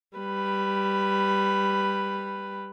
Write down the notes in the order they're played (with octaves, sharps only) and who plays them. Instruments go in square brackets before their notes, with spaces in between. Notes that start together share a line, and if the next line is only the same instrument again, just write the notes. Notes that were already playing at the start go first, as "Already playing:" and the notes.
[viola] G3 B4